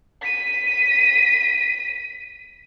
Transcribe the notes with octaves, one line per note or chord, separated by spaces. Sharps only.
B6 D#7